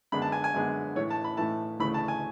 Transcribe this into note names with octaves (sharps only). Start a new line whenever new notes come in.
F#2 D3 G#3 B3 D4 B5
A5
G#5
G#5
F#2 D3 G#3 B3 D4
A2 E3 A3 C#5
A5
B5
A2 E3 A3 A5
D2 C#3 E3 A3 B5
A5
G#5